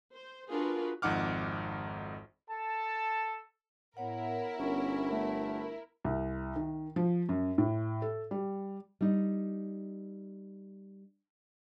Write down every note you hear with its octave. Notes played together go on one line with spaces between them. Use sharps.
C5
D4 F4 F#4 G#4 A#4 B4
G#1 F2 D#4 F#5 D6 F6
A4 A5
A2 B3 E4 A#4 C#5 F#5
G1 C#4
A3
C2
D#3
F3
F#2
A2
A4
G3
G3 D#4